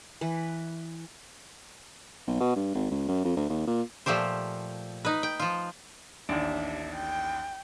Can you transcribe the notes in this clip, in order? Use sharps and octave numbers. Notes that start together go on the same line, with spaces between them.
E3 B4
B1
B2
G2
G#1
C#2
F#2
F2
D2
D#2
A#2
A#2 F3 A3 G4 C5
D#4 B4
G5
F3 F4
A1 D#2 D4 E5
G5